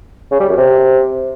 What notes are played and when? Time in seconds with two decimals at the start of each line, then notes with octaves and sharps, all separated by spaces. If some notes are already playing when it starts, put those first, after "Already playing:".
0.32 C#3
0.40 G3
0.49 F#2
0.58 C3